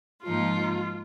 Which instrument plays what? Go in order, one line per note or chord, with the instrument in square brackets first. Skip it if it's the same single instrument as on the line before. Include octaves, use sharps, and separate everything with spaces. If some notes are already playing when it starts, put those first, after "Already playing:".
[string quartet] G#2 F3 A#3 D#4 F4